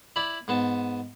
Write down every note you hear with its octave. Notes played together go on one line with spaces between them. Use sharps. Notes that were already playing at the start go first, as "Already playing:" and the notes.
E4 D5 B5
G#2 B3 A5